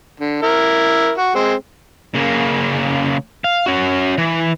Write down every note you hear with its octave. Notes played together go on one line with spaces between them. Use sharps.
D3
E4 A#4
F#4
G#3 C4
C#3 A#3
F5
C#4 F#4
E3